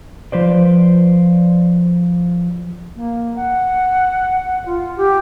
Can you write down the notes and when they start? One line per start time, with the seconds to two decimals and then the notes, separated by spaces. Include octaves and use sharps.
0.32 F3 B4 C5 D5
2.96 A#3
3.36 F#5
4.66 F4
4.97 G4